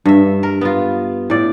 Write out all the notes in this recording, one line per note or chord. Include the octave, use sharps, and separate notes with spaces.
G2 E5
A#4
B3 F4
A2 D5